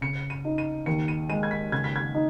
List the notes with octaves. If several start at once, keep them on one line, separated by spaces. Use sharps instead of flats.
C#3 C#7
D#7
D#4
D#7
D#2 C#7
D#7
G#3 D#7
G#6
B6
C#3 G#6
B6
G#6
D#4